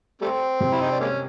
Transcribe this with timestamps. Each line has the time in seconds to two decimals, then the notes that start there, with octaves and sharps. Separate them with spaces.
0.21 G3 A3 C4
0.60 C3
0.72 E4
0.81 D#4
0.91 D4
1.00 G#3 A#3 C#4